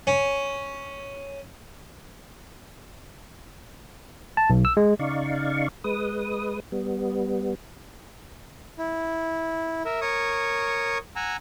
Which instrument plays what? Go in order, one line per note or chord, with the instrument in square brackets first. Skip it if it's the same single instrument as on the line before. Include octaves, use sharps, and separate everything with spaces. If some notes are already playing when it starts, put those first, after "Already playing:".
[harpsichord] C#4
[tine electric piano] A5
B1
E6
G#3
[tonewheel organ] C#3 D#4 D5 F5 C#6
G#3 B4 D#6
G3 B3
[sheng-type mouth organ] E4
A#4 E5
A#4 C#5 C#6 D#6
F#5 G#5 A#5 E6